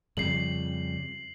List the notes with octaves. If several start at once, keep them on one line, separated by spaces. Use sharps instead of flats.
F2 C#3 G3 C7 F#7